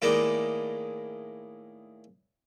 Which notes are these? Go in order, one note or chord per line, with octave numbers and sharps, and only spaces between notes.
A2 D#3 G#3 A#3 D4 E4